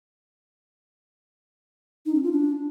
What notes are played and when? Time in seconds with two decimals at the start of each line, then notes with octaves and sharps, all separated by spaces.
2.06 D#4
2.15 C#4
2.24 F4
2.32 D4